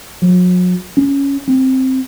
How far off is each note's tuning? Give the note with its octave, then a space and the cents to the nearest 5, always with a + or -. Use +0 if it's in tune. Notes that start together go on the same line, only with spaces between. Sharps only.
F#3 -40
C#4 +5
C4 +0